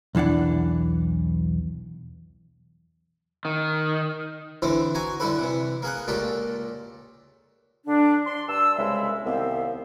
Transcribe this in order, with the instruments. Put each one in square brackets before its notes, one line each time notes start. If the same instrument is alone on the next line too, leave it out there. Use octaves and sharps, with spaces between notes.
[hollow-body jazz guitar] B1 E2 E3 D4 F#5
[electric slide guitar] D#3
[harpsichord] D3 E3 C4 E4
F#4 G#5 A#5
D3 G3 E4 A4 B4
C3 E3
A#3 G#4 F#5
C#2 A#2 G4 A4
[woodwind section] D3 D4
C6
G2 A5 E6
C2 C#3 G#3 E5 E6
C2 D#3 B3 C4 F5